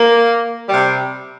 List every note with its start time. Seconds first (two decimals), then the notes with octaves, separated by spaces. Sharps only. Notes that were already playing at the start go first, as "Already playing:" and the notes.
Already playing: A#3
0.68 C3 G3